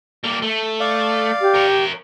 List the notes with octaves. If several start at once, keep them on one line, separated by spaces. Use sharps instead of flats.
G3 A#3
A3
D5 F5
G4
A#4 C#5